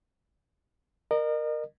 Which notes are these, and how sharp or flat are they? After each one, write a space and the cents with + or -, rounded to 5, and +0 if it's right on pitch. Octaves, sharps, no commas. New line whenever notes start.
A#4 +0 D#5 -40